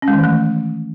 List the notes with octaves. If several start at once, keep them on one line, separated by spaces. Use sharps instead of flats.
C#4
G#3
D#3
E3
A3